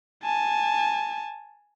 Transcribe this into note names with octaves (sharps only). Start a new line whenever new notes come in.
G#5 A5